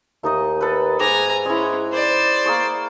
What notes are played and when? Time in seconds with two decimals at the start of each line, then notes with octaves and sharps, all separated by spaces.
0.23 D#2 A3 D#4 D#5
0.61 A4 B4
1.00 G#2 G#5 A#5 D6
1.45 G#3 C#4 E4
1.93 C5 D5
2.46 A#3 G#4 C#6